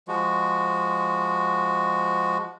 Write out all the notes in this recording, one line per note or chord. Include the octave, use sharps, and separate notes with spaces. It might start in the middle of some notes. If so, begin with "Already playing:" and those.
F3 G#3 F#4